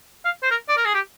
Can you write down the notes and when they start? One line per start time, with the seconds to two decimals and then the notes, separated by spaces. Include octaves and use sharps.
0.25 F5
0.43 C5
0.50 A#4
0.69 D5
0.77 A#4
0.85 G#4
0.94 G4